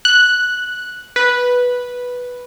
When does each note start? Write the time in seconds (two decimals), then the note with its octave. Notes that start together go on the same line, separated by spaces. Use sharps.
0.05 F#6
1.16 B4